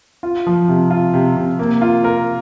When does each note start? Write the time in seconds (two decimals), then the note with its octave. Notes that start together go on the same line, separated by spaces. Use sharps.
0.23 F4
0.47 F3
0.68 C3
0.91 F4
1.14 C3
1.36 C3
1.59 A#3
1.82 F4
2.04 A#4